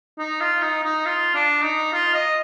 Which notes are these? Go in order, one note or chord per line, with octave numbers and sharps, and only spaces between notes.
D#4
F4
D#4
D#4
F4
D4
D#4
F4
D#5